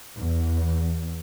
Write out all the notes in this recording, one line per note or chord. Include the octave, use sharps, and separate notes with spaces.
E2